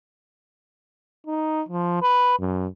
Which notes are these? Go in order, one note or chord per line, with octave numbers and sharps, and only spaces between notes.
D#4
F3
B4
F#2